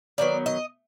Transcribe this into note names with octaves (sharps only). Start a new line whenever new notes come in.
D#3 F#3 B3 D5
D#5